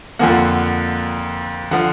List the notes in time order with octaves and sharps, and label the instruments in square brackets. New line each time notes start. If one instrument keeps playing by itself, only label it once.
[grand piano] F2 D3 F3 A#3 F#5
D3 F3 F#5